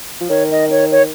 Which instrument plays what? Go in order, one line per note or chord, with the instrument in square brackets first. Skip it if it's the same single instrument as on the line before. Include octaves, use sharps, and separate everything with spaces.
[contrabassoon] F3
[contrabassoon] D#3 [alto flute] C#5
[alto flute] D#5
C#5
C#5